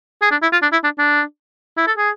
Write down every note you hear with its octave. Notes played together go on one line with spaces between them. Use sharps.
G#4
D4
E4
F4
D4
E4
D4
D4
E4
A4
G#4